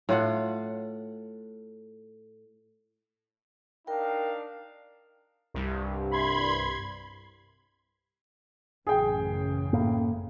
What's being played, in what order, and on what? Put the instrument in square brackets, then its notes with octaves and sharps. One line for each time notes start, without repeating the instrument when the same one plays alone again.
[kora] A2 F4 F#5
[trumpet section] D4 D#4 F5 [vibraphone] A#4 G5
[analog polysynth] C2 G2
[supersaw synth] B5 C6 G#6
[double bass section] A1 F#2 C#3 [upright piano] G#4 G5
[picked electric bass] A2 A#3